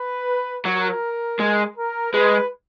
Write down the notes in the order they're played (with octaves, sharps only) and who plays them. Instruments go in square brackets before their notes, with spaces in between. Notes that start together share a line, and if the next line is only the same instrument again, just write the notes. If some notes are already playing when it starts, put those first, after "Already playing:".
Already playing: [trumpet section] B4
[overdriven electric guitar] F#3 [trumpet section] A#4
[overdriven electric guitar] G#3
[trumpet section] A#4
[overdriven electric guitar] G#3 [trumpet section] B4